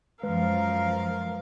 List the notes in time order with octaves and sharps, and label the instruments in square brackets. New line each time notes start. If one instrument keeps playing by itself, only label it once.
[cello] F#2 F3 [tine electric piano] G#3 B4 [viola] A#4 F5